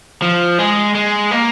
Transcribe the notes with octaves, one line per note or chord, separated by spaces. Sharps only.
F3
G#3
G#3
A#3